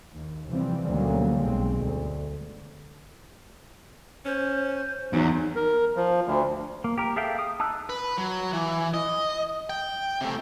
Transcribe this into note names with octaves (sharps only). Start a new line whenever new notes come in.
D#2
C3 E3 F3 G3 C4
D2 B2 F#3 G3 A#3 C#4
B1 G2 B2 G#3 C4
D2
C#4 C5
E2 F#3 D#4
A#4
F3
D2
A#3
G4 A#4
G#4 A4 E5 F5 G5
D#6
D#4 A5 D#6 E6 F#6
B4
F#3
E3
D#5
G5
C3 A3